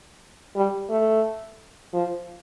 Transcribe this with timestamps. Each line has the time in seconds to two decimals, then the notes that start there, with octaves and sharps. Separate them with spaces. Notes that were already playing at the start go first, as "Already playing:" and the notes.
0.56 G3
0.90 A3
1.93 F3